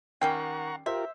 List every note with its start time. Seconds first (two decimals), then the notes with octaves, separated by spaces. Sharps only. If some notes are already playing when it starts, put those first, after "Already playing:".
0.21 D#3 G3 C#4 F#5 G5 A#5 C#6 C7
0.86 F4 G4 A#4 C5 E5